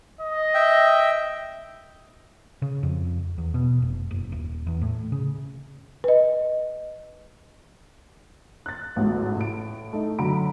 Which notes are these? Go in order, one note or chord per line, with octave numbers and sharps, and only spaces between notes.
D#5
E5 G5
C#3
F2
E2
B2
F1
F#1
D#1
E2
A2
C#3
B4 D#5
F#6 A6
A1 D2 G#2
A2 D7
A3 D#4
F#2 D3 F#3 A#5 B5 D7